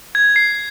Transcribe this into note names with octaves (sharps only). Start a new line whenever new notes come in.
G#6
C7